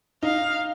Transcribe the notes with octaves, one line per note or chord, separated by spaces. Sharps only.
D#4 F5